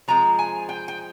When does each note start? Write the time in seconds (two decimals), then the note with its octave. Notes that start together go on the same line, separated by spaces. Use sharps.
0.08 F3 G#3 C4 A#5
0.39 G#5
0.69 G5
0.88 G5